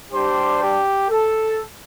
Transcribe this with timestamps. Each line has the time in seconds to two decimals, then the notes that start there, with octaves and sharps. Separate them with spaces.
0.11 G3 D4 G4 C5
0.61 G4
1.09 A4